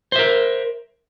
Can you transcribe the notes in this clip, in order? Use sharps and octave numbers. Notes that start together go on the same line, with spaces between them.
A#4 C5 E5